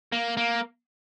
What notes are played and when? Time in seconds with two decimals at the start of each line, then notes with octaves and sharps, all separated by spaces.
0.12 A#3
0.37 A#3